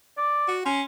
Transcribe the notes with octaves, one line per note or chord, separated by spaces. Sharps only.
D5
F#4
C#4 C6